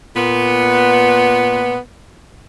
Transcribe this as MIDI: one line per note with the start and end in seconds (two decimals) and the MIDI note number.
0.16 1.77 46
0.16 1.77 59